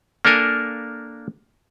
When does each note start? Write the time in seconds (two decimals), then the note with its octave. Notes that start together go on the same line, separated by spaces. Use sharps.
0.25 A#3 D4 A4 A#4 G#5